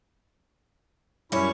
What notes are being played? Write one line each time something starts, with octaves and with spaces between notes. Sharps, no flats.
F#2 G3 C#4 E4 C#5